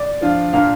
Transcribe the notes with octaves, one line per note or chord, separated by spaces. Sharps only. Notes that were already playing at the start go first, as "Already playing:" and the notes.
Already playing: D5
F3 D4 F4
A#2 A#3 D4 F5